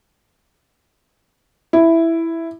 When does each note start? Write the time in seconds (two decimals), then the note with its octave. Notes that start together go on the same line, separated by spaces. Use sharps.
1.73 E4